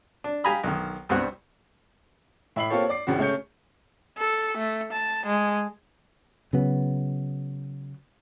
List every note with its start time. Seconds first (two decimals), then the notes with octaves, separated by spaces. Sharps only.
0.24 D4
0.44 G4 F5 G#5 A#5 B5 D#6
0.64 B1 D#3
1.09 C2 G2 B3 C4 F#4 F#5
2.56 A2 E5 B5 C7 F#7
2.70 A#3 C4 F4 G4 A4 C#5
2.89 D5 D6 C7
3.07 D#1 G#1 C#2 A2 C#3 F#4
3.19 C#3 A3 C#5 G6 C#7
4.18 A4
4.57 A3
4.93 A5
5.26 G#3
6.53 C#3 F#3 B3